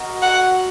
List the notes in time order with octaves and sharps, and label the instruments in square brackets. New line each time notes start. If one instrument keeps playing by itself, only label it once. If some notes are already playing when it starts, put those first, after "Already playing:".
Already playing: [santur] F#4 A#4 D#5
[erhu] F#5